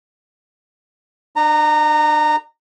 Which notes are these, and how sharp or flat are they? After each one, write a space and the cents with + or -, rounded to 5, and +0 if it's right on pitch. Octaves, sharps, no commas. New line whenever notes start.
D4 +35 A#5 -20